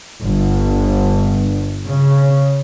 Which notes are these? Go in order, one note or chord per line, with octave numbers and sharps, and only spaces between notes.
G1
C#3